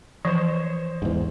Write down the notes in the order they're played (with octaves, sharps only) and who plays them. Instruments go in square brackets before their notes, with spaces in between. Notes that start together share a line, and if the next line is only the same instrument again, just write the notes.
[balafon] E3 F3 [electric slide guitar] C5 C#5
[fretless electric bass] E2 G#2